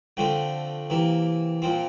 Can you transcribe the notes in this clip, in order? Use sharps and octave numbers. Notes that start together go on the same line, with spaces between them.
D3 F3 A3 C4 G5
C3 E3 A#3
A#2 F3 C4